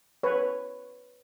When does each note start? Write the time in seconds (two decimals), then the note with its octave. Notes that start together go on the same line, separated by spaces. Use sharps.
0.23 B4 C#5